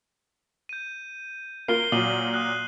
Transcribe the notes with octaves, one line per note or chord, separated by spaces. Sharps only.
G6 D#7
A#3 F4 A#4 C7 G7
A#2 F#3 D#6 D#7 F#7
D#6 F#6 F#7